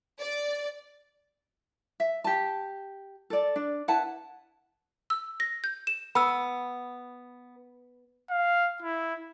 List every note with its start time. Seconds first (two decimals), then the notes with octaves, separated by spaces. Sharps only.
0.20 D5
2.00 E5
2.24 G4 A5
3.30 A4 D5
3.56 D4
3.88 E4 B4 F#5 A5
5.10 E6
5.40 A#6
5.64 G6
5.87 E7
6.15 B3 B5 E6
8.30 F5
8.82 E4